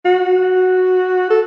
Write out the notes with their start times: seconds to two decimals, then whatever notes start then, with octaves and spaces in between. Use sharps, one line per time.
0.05 F#4
1.30 A4